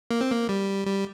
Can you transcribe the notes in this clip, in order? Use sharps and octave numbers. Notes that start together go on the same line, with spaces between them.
A#3
C4
A#3
G3
G3